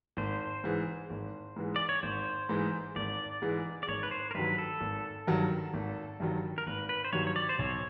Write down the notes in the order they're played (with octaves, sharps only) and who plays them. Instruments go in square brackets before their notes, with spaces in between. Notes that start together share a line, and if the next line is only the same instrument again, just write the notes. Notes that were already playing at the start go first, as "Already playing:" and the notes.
[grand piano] G#1 [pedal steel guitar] C5
[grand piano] G#2 E3 G#3
G#1
G#2 E3 G#3
[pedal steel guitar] D5
C#5
[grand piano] G#1 [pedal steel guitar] C5
[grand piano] G#2 E3 G#3
[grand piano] G#1 [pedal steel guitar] D5
[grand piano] G#2 E3 G#3
[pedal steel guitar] D5
[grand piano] G#1 [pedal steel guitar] C#5
[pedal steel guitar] B4
C5
A#4
[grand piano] G2 D#3 F#3 [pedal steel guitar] B4
[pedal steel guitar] A4
[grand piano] G#1
G2 D#3 F#3
G#1
G2 D#3 F#3
[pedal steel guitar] A#4
[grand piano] G#1 [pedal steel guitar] B4
[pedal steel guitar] B4
C5
[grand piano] G2 D#3 F#3 [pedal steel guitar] C#5
[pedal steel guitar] C#5
D5
C5
[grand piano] B1 [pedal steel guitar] C#5